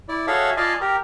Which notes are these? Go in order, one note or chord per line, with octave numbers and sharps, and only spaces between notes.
E4 D5
F#4 G#4 A4 C#5 E5 F5
F4 D5 D#5 F5 G#5 A5
G4 A#4